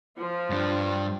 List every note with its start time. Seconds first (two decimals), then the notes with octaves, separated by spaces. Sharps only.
0.17 F3 F4
0.50 G2 D4